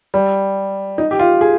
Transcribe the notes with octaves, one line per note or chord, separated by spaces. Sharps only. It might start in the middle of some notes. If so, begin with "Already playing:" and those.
G3
D#4
G4
F4
G#4